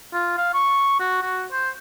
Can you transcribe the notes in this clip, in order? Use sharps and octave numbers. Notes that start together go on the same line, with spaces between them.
F4
F5
C#6
F#4
F#4
C5